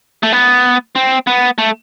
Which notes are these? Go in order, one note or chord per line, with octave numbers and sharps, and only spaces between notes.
A3
B3
C4
B3
A3